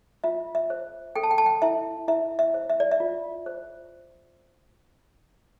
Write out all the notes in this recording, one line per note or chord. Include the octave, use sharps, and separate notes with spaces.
F4 E5
E5
C5
A4 G5
A5
G5
A5
G5
E4 E5
E4 E5
E5
C5
E5
D5
E5
F4
C5